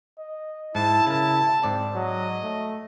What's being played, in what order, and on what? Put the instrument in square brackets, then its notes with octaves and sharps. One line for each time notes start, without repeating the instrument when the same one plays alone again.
[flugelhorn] D#5
[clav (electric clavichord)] G#2 [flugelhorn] E4 [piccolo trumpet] A5
[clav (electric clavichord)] C#3 A#4 [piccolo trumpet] A5
[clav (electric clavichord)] G#2 D5 A5 [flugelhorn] C4
[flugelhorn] F#3 [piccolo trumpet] D#5
[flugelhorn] A3